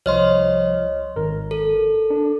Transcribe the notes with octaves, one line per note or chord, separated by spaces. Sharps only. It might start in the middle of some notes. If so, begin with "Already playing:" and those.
C2 F3 C#5 D#5 C6 F6
G#1 A#4
A4
D4